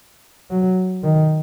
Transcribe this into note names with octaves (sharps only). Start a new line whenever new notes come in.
F#3
D#3